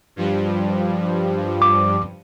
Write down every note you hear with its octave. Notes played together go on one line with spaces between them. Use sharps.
G2 F3 G3
D6